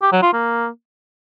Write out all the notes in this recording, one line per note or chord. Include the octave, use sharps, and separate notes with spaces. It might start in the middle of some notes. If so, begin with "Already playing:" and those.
G4
F#3
F4
A#3